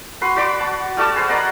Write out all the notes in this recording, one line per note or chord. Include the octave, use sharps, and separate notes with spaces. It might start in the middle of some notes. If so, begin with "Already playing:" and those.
F#4 B4 C6
F#4 D5 B5 D6
A5
G3 A3 F#4 A5
G#4 B4 C5
A#4 D5 D#5 F#5